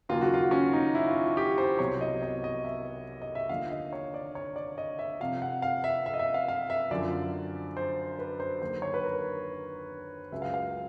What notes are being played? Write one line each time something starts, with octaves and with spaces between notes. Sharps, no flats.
D#2 C#3 F#3 F4
F#4
F4
C#4
D#4
E4
F4
G4
C5
C2 B2 F#3 C#5
D#5
D#5
D#5
E5
D#5
E5
D#2 D3 F3 F5
D#5
C#5
D5
C#5
D5
D#5
E5
F2 C3 F3 F5
F#5
F5
E5
E5
D#5
E5
F5
F5
E5
F#2 D3 F3 D5
C5
B4
C5
D#2 D3 F#3 C5
C#5
B4
A#4
C#2 C#3 F#3 E5
F5
F5